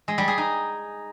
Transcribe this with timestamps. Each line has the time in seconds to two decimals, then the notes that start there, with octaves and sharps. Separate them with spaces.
0.08 G#3
0.18 G3
0.28 G#4
0.38 D#4